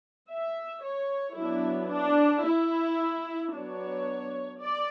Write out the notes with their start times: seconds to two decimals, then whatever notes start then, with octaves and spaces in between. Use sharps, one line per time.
0.30 E5
0.84 C#5
1.37 F#3 B3 D4 E4
1.90 D4
2.44 E4
3.53 F#3 B3 D4 C#5
4.60 D5